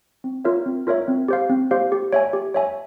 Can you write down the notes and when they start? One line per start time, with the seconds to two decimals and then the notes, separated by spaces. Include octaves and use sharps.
0.24 C4
0.45 F4 A#4 C#5 E5
0.66 C4
0.87 F4 A#4 C#5 E5
1.08 C4
1.28 G4 C5 F5
1.50 C4
1.71 G4 C5 F5
1.92 G4
2.13 C#5 E5 G#5
2.33 G4
2.54 C#5 E5 G#5